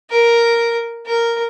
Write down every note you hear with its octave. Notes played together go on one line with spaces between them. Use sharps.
A#4
A#4